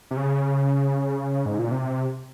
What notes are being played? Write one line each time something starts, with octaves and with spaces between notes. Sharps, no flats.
C3
C#3
G#2
A#2
C3